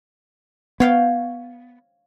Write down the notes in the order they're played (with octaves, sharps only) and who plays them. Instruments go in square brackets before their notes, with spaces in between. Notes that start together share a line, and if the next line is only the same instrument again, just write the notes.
[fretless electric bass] B3 [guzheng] C#5 F5 G5